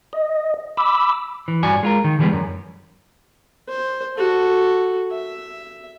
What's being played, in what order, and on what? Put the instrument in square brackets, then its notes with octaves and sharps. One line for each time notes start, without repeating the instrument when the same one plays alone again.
[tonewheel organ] D#5
B5 D6 E6
[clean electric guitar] E3
G2 F#4 D5 G#5
G#3 F4 A#4
D#3
D3 E3 G3 G#3 B3
F#2
[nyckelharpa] C5
F#4 A4
E5